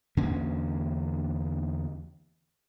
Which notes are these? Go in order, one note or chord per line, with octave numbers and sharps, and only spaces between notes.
E2 D3 A#3 C#4